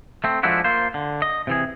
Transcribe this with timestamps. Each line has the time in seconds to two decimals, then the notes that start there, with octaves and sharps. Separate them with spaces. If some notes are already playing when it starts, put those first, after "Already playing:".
0.24 A3 C4
0.43 F3 G#3 A3 D4 E4 F#4
0.64 A#3 F4 C5
0.94 D3
1.22 D#5
1.47 C3 E3 G#4